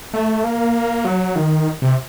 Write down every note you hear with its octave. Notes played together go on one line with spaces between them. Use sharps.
A3
A#3
F#3
D#3
C3